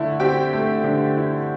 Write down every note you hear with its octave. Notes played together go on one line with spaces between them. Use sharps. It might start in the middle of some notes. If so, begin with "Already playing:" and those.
Already playing: D3 A3 E4 A5
C4 G4 G5
A3
D3
E4